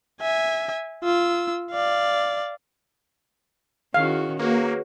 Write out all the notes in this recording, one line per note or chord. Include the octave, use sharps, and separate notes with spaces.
E5 G#5
F4 E6
D5 F5
D#3 C#4 E4 F#4 G#4 F5
A#3 F#4 G#4 B4 C#5